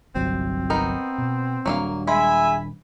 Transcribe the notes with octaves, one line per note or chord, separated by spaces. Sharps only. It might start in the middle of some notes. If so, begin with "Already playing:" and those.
G1 C2 F#3 C4
B3 D#4 A#4
B2
D#1 F#3 G3 A#3 D4 F5
G#3 E5 G#5 B5